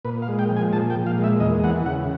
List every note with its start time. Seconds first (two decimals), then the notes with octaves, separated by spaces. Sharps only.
0.05 A#2 B4
0.22 F5
0.28 G#3
0.39 G5
0.50 F3
0.56 G#5
0.73 A#2 A5
0.90 G5
0.96 A#2
1.06 F5
1.18 G#3
1.24 E5
1.40 E2 D#5
1.64 E3 F#5
1.86 C#3 F#5